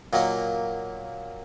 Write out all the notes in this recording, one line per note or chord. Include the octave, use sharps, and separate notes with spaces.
A#2 F#3 A#3 D#4